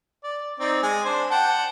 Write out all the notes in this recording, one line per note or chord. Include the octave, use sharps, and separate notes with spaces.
D5
C4 D#4 D5
G#3 G#5
D4 C5
F#5 G5 A5